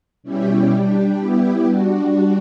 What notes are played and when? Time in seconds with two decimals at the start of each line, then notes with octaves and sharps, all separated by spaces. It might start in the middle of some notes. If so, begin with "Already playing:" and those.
0.23 B2 G3 C#4 E4 G4
0.70 G3 D4 G4
1.18 G3 B3 E4 G4
1.66 G3 D4 F#4